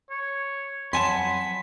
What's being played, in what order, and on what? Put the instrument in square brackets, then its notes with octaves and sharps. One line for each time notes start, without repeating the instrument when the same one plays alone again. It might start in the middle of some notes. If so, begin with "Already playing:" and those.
[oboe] C#5
[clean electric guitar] F2 G#5 A5 [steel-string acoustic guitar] F#3 F#5 [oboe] B5 [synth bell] C6